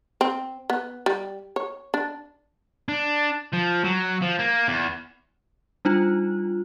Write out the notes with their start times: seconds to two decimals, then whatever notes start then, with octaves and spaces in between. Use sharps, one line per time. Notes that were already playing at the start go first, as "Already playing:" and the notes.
0.21 C4
0.70 B3
1.06 G3
1.56 C#5
1.94 D4
2.88 D4
3.53 F3
3.84 F#3
4.22 F3
4.39 A#3
4.68 E2
5.85 G3 D4 D#4 F4